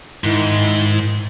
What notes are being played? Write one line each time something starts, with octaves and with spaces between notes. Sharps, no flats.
G#2 D#3 E4